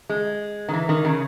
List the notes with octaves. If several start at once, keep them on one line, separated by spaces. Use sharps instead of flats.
G#3
D#3
E3
D#3
C#3